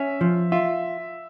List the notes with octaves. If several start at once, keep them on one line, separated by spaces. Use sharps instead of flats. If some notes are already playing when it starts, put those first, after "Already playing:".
Already playing: C#4 E5
F3
F4 E5